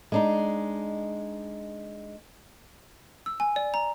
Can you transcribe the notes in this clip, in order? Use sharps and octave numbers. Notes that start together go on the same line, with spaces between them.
G#3 D4 D#4
E6
G#5
D5
A#5